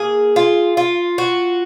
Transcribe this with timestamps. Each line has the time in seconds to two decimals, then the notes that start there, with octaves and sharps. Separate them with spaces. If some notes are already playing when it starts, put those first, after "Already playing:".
Already playing: A#3 G#4
0.36 F4
0.77 F4
1.18 F#4